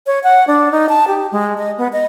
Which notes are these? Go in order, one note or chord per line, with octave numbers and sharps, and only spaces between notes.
C#5
F#5
D4
D#4
A5
G4
G#3
D#5
B3
D#5